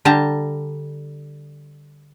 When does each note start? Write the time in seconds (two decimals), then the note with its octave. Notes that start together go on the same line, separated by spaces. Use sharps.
0.05 D3 G3 A5 A#5